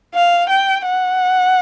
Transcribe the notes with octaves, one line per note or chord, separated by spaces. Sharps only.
F5
G5
F#5